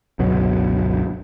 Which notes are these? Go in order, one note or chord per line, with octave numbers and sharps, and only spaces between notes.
G1 C#2 B2 F#3